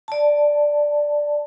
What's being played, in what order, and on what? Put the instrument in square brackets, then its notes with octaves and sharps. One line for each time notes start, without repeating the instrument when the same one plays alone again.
[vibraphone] D5 A5